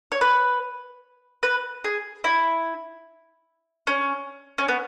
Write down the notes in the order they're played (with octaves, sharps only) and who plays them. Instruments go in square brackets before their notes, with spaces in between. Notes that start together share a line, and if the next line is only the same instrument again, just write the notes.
[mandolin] C#5
B4
B4
G#4
E4
C#4
C#4
B3